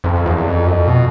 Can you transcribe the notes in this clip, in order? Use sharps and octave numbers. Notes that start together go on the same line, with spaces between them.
F2
E2
F2
F#2
F2
B2